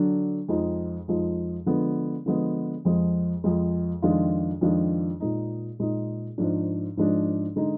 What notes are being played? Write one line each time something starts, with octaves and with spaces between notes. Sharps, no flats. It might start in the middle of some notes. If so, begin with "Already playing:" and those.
Already playing: D3 F#3 D4
F2 F3 G#3 D#4
F2 F3 G#3 D#4
D3 F3 G#3 B3
D3 F3 G#3 B3
F2 F3 G#3
F2 F3 G#3
F2 D#3 G#3 D4 F4
F2 D#3 G#3 D4 F4
A#2 G#3 D#4
A#2 G#3 D#4
G#2 F3 G#3 D4
G#2 F3 G#3 D4
D3 G#3 D#4